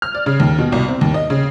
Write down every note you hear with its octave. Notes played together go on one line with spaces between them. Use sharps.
F6
D5
C#3
D#2
B2
C2
C4
D#2
D#5
C#3